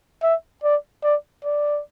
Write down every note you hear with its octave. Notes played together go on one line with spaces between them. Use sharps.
E5
D5
D5
D5